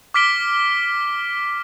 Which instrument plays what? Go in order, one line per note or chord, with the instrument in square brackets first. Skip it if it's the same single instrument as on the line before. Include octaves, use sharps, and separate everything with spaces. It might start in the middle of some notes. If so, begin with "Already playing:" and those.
[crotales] D6 F6 B6 D7 G7